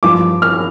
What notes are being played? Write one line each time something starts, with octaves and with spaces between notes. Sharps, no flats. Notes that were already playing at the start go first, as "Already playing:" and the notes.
G2 F3 D6
F6